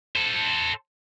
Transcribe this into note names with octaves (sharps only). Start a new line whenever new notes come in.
A4 C5